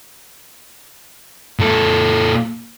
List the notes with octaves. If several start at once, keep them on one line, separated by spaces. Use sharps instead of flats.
A#2 A4